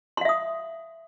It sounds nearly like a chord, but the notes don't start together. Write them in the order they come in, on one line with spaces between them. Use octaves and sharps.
C6 F5 E5 D#6